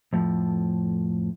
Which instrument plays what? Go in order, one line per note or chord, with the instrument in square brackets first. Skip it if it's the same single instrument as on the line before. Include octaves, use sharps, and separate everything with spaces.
[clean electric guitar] F2 A2 F3